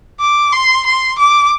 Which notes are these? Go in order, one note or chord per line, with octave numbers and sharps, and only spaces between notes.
D6
C6
C6
D6